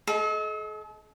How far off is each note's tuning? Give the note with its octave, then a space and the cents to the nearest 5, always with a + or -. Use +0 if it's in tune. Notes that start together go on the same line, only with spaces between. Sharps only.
A4 -45 D#5 +15